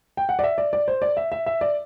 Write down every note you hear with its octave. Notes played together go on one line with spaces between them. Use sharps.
G5
F#5
D5
E5
D5
D5
C5
D5
E5
E5
E5
D5